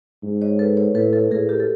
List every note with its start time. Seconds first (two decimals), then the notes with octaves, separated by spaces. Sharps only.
0.23 G#2
0.42 C#5 D#5
0.59 A4 B4
0.77 B4 C#5
0.95 A2 A4 B4
1.13 A4 B4
1.31 A2 G#4 A#4
1.49 G4 A4
1.60 A4